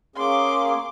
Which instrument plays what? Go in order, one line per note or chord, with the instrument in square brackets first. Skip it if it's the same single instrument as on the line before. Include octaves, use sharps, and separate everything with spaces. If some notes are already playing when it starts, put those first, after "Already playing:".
[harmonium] A#3 C#4 G#4 [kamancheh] C6 D6